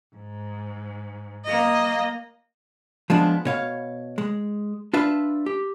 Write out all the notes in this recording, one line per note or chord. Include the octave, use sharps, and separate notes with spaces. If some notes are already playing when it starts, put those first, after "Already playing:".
G#2
A#3 D#5
F3 G#3 B3 D4
B2 C#5 F5
G#3
D4 F4 B4 E5
G4